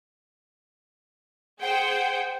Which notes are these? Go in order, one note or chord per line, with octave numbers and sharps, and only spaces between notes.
G#4 C5 F#5 G5